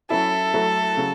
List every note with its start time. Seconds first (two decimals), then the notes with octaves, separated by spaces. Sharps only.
0.10 F#3 C#4 E4 A4
0.53 F#3 A3 E4
0.97 C#3 F#3